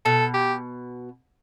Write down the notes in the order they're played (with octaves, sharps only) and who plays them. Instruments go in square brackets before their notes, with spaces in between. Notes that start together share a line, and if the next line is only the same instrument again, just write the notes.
[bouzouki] B2 [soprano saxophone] A4
[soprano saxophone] G4